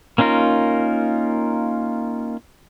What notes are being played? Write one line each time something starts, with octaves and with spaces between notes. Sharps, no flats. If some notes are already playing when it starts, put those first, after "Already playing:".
A#3 C#4 D#4 F4 A#4